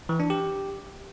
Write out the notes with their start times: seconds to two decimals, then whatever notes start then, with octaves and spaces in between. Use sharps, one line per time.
0.09 E3
0.20 D4
0.30 G4